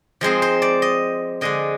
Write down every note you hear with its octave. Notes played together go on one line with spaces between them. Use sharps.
F3 G#3 C4 D#4 C5
C5
D5
D#5
D3 G#3 D4 D#5